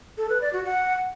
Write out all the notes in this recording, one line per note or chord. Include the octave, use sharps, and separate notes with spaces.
A4
B4
D5
F#4
F#5